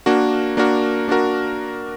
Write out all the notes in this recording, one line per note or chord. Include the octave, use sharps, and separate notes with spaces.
A#3 D4 F#4 A#4
A#3 D4 F#4 A#4
A#3 D4 F#4 A#4